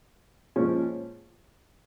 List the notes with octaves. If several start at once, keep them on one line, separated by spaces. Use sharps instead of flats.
A#2 F3 G#3 C#4